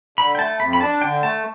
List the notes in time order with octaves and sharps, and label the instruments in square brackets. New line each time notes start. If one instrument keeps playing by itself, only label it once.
[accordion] D3 [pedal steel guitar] B5
[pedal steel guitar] G5
[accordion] A3 [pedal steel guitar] A5
[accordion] F2 [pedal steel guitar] B5
[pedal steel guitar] B5
[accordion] D4 [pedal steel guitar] A5
[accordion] D3 [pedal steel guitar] G5
[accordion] A3 [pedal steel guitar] A5